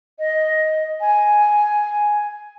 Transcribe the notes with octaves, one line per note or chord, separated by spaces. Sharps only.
D#5
G#5